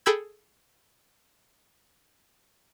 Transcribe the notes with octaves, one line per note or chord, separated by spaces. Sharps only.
G#4 A4 G5 B5 E6 G#6